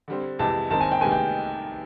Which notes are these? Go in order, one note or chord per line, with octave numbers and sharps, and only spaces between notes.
D3 G3 C4
F2 C3 E3 G#3 A5
F#2 D#3 G#3 C4 A5
G#5
G5
D2 C3 D#3 G#3 B3 G#5
G5